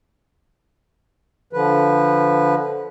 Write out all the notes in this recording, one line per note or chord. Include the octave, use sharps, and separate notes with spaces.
D3 F3 B4